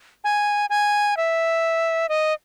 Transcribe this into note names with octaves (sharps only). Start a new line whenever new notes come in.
G#5
G#5
E5
D#5